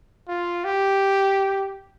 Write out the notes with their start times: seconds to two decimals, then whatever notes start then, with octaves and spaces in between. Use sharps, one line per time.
0.28 F4
0.64 G4